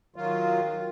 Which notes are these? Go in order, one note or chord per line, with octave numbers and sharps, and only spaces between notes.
D#3 F#3 F4